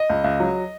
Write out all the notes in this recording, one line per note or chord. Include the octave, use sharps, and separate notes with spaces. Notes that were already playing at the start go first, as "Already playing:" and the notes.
Already playing: D#5
C#2
C#2
F#3